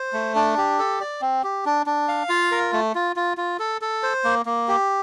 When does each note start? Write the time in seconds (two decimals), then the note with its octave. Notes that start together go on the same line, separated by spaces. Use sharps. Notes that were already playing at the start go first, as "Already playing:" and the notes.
Already playing: C5
0.13 A3
0.35 D4
0.57 G4
0.79 A4
1.01 D5
1.21 C4
1.44 G4
1.66 D4
1.86 D4
2.08 F5
2.29 F4
2.51 A#4
2.73 A3
2.95 F4
3.16 F4
3.37 F4
3.59 A4
3.82 A4
4.03 C5
4.24 A#3
4.46 A#3
4.68 G4